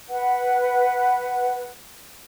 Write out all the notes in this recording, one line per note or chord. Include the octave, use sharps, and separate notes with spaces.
B4 F#5